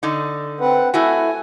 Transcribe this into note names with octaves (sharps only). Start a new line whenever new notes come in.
D3 D#4
C4 B4 F#5
A3 E4 F#4 G#5